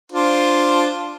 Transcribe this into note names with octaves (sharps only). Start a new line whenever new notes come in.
D4 F4 C5